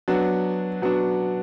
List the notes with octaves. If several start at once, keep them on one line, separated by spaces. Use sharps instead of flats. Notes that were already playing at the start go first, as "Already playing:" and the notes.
F#3 B3 D4 F#4
F#3 B3 D4 F#4